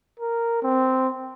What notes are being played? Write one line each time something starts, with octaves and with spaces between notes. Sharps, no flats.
A#4
C4